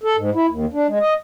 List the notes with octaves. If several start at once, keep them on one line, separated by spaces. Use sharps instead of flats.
A4
G#2
E4
D#2
D4
G#3
D#5